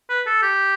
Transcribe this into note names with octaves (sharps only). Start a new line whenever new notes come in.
B4
A4
G4